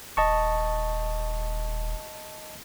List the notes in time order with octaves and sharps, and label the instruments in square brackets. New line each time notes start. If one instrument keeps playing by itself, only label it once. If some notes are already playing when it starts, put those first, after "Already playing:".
[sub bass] D#1 [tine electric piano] D#5 A5 C#6